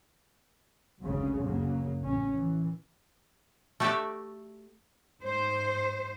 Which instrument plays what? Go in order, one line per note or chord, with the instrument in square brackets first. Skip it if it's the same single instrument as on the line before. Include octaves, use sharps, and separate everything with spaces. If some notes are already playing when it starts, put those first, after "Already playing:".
[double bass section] G#1 D2 G#2 C#3 F#3
F#1 C#3 F#3 A#3
A1 C#4
E3
[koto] A3 F#4 G4 A4 D5 E5
[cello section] G#2 C5